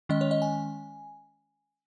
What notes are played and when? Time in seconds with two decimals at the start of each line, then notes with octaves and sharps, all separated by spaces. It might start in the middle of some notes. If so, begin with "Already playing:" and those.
0.09 D#3 G#3 C#4 D#5
0.21 C#5
0.31 D#5
0.42 G#5